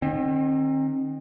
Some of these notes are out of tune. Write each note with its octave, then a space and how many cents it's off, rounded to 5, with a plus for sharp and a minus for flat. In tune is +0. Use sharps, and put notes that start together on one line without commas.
D#3 -20 C4 +35